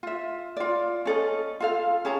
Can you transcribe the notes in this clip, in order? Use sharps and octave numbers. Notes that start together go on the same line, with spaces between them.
F4 E5
F4 D5
C#4 A4 D#5
F4 A4 F5
C#4 G#4 A5 A#5